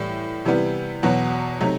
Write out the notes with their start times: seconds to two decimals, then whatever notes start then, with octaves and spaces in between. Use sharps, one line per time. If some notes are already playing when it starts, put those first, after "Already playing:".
Already playing: A2 E3 G3
0.45 C3 E3 G3 B3
1.03 E2 B2 F#3 B3 F#4
1.60 C3 F#3 A3 D#4